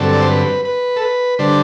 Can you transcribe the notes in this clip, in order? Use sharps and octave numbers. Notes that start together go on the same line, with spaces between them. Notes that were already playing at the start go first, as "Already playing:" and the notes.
Already playing: G2 D3 F#3 C4 A4
D5
C5
B4
B4
A4
B4
D3 G3 D4 C5